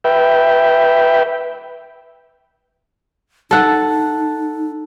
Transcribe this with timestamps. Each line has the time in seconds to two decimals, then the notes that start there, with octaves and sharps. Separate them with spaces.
0.04 B4 E5 G5
3.51 D#4 A4 F#5